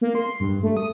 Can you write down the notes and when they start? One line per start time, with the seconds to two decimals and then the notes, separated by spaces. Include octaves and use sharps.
0.01 A#3
0.15 C6
0.40 G2
0.63 A3
0.77 D#6